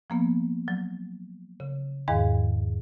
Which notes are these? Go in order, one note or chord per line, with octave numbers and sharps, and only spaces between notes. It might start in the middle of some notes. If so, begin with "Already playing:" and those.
F3 A#3 B3
F#3
C#3
E2 G#2 D#3 G#4 F5